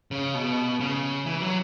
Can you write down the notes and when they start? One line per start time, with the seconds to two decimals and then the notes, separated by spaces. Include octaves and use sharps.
0.11 C#3
0.35 B2
0.80 C#3
1.26 E3
1.42 F#3